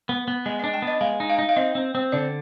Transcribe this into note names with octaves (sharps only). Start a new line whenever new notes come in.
B3
B3
G#3 D#5
D4 D#5
G5
B3
D#5
G#3 F5
D#4
F5
D#4
F5
C4 D#5
C4
C4
D3 D5